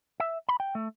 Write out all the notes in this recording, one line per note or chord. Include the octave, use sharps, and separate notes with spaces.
E5
B5
G5
A3